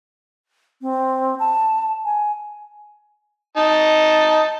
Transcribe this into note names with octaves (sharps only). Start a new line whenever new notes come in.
C4
A5
G#5
D#4 A5